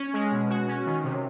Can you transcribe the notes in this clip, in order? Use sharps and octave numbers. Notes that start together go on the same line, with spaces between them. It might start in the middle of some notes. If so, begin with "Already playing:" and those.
Already playing: C#4
G#3
B2
F#4
C#4
D#3
C3